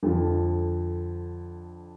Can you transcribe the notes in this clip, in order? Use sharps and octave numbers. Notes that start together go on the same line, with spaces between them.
F2 D3 F3